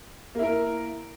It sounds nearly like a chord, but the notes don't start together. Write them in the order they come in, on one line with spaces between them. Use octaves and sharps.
A#3 E4 A#4